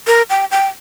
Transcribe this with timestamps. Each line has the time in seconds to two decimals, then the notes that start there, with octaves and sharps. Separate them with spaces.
0.07 A#4
0.30 G5
0.51 G5